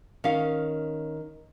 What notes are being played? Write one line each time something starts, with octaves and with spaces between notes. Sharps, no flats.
D#3 C#4 F5